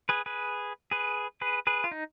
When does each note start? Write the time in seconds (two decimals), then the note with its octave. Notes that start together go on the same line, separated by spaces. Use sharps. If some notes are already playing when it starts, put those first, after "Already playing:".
0.09 G#4 B4
0.26 G#4 B4
0.91 G#4 B4
1.41 G#4 B4
1.67 G#4 B4
1.84 F4
1.91 D#4